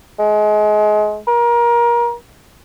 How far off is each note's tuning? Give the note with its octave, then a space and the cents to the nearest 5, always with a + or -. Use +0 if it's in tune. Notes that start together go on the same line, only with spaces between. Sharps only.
G#3 +30
A#4 +25